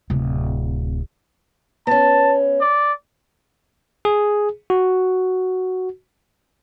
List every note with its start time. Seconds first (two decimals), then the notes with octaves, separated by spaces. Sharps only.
0.10 D1 C3
1.87 B3 C#4 A5
2.61 D5
4.05 G#4
4.70 F#4